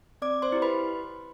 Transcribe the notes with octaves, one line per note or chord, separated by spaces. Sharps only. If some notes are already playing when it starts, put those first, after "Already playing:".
C4 D5 D6
C5 C6
E4 G4
B4 B5